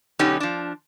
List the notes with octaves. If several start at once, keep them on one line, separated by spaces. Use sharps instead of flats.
B2 D3 F#3 C#4 D#4 G4
F3 D4